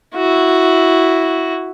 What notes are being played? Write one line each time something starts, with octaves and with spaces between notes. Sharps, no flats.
E4 F#4